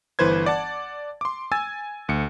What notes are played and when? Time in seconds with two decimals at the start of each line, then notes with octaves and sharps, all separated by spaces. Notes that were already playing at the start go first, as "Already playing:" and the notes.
0.19 G1 E3 B4 C5 G#6
0.46 D5 F#5 A5 A6
1.21 C6 D6
1.52 G#5 E6 G#6 A6
2.09 D2 C#7